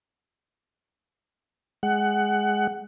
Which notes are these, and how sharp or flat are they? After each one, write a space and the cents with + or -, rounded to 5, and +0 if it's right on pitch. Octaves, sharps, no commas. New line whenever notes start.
G#3 +0 F#5 +15